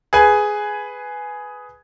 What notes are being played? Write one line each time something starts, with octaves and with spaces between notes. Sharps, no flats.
G#4 B4 G#5